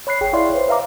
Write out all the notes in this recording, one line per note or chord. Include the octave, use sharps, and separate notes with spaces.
C#5 B5 F#6 C7
G#1 G#4 C#5 G5
E4 C#5 D5 E5 F5 C6
B4 C5
B4 E5 F5 A#5 D6